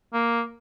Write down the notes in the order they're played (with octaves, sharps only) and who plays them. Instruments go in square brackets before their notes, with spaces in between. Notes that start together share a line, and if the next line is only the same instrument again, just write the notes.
[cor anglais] A#3